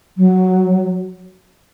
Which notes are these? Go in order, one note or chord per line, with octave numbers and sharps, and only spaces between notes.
F#3